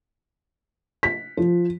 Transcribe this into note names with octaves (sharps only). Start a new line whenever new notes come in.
B6
F3